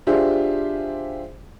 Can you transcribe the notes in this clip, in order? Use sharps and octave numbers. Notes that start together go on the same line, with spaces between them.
D4 F4 G4 G#4 C5 E5